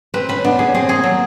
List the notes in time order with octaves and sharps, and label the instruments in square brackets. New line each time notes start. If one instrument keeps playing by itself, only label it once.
[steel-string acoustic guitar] C4 [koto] B4
[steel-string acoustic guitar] C#4 [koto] B4
[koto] B3 [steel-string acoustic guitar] D4
[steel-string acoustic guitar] C#4 [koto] G#4
[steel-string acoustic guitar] C4 [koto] G#4
[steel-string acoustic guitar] A#3 [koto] G#4
[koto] F#3